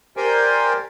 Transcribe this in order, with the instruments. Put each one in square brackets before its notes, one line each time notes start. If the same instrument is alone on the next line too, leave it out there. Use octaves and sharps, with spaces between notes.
[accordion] G4 A#4 C5 D5 G5 G#5